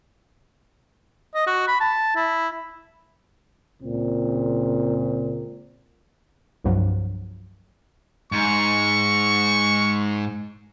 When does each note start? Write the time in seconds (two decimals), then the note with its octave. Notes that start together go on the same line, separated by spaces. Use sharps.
1.35 D#5
1.47 F#4
1.68 B5
1.80 A5
2.16 E4
3.82 C#2 A#2 C#3 C4
6.64 C2 G2 F3 F#3
8.32 G#2 C#6